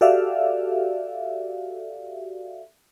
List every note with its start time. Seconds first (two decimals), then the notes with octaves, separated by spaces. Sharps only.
0.01 F#4 G4 A4 D5 E5 F5